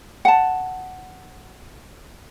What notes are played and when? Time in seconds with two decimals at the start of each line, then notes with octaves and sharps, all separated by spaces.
0.25 F#5 A5